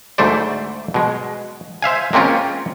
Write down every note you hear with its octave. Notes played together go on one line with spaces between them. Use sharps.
D2 G#2 A3 C5 D5
B2 G#3
C5 E5 F5 G#5
G#3 A#3 C4 C#4 F4